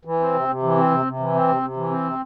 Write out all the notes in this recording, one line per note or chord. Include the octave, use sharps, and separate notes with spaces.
E3
C4
C3
C3
E3
C4
C3
C3
E3
C4
C3
C3
E3
C4
C3